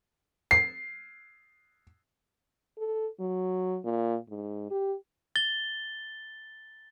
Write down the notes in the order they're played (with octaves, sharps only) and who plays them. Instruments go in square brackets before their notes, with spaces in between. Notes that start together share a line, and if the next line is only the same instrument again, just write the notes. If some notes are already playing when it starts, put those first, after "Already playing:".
[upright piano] C7
[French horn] A4
F#3
A#2
G#2
G4
[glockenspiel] A6 G7